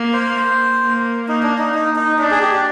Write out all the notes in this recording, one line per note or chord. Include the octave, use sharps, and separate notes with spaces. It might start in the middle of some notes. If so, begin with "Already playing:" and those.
Already playing: A#3
C5
A#3
A#3 D#4
D4
D#4
D#4
D#4
D4 D#4
G#4
G4
G4